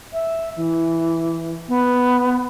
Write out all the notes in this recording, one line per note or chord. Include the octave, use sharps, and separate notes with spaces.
E5
E3
B3